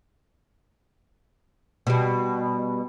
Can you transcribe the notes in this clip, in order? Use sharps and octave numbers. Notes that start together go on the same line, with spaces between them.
B2 G3